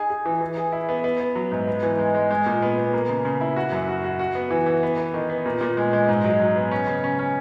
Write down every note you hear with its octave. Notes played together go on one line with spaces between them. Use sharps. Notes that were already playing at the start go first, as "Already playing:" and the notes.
Already playing: D#4 G#4
G#4
E3
E3
G#4
E4
B3
B3
B3
F#3
G#2
B3
E3
G#3
G#3
G#3
A#2
B3
B3
A#3
C#3
C#3
E4
F#4
F#2
F#4
F#4
F#4
B3
E3
E3
B3
B3
D#3
B3
A#2
A#2
G#3
G#3
G#2
F#3
F#3
B3
C#4
C#3
C#4
C#4